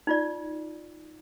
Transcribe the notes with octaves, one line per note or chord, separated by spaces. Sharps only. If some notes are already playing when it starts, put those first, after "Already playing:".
D#4 F4 D5